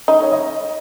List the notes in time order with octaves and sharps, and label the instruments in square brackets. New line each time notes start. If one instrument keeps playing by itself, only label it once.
[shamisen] D#4 [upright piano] D#5
[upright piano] C#5
D#5